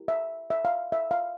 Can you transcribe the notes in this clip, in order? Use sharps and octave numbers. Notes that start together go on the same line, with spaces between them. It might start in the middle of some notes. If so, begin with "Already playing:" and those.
Already playing: E4 G4 A#4
E5
E5
F5
E5
F5